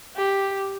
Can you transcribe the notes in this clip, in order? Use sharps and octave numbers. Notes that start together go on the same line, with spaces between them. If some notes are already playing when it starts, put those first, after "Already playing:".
G4